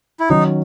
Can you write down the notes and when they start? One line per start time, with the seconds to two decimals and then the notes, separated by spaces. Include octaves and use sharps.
0.20 E4
0.29 D#3 F#3 C#4 D#4